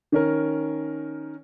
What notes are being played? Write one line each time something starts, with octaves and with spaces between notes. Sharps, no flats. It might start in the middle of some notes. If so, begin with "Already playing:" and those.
D#3 C#4 A#4